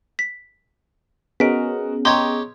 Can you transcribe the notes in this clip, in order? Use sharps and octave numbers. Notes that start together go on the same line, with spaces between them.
B6
B3 C#4 F#4 G#4 A#4 D#5 B6 D7
G4 C#5 D#5 G5 A#5 C6